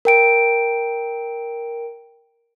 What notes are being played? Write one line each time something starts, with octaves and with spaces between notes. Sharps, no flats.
A#4 G5 D7